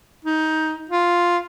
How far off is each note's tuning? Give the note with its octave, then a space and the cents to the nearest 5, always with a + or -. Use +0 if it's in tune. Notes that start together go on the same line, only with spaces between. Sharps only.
D#4 +15
F4 +0